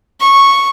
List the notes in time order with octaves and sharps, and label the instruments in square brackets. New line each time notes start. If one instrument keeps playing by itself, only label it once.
[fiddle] C#6